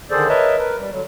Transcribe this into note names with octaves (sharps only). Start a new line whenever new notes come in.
D3 D#3 G#4 A4 C5 D5
A#4 B4 C#5 D#5 E5 A5
A#4 B4
G3
D3 F#3